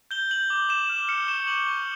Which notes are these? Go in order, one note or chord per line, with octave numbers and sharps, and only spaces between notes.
G6 G7
G6 F#7
D6
D6 E7
F6
F6 C#7
C#6 E7
C#6 F#7
C#6